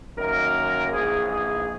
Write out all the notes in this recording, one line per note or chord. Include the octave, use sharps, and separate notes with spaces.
F#2 D#3 A#3 A#4
A#1 G#2 E3 G#4
G#4